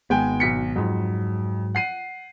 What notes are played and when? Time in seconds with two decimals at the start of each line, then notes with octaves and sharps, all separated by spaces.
0.10 G#1 G#3 B3 G5 G#5
0.40 B1 B6 C#7
0.76 F2 G#2 F#3
1.75 F#5 C7 D#7